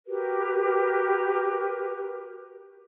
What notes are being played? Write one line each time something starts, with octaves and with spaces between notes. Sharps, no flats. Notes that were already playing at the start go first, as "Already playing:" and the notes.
F#4 G4 A#4 B4